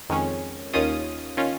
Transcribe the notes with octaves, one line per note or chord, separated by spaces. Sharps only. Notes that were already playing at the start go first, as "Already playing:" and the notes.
F2 D#3 G#3 C#4
D#2 D#3 C#4 F4 D#6
D#3 C#4 F4